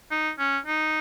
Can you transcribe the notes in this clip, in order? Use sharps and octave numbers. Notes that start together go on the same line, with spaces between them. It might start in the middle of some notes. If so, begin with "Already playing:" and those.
D#4
C#4
D#4